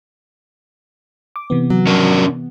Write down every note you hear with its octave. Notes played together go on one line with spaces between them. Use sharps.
D6
C3 E3 B3
F#3
C#4 D4 A#4